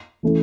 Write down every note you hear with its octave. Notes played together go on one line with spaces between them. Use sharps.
E3 A3 C#4 E4